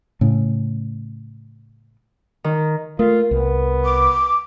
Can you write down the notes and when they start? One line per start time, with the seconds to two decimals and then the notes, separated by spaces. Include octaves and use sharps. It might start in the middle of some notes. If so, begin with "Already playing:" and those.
0.21 A2 C#3
2.44 D#3
2.99 A3 F4 A#4
3.31 C2 B3
3.84 D6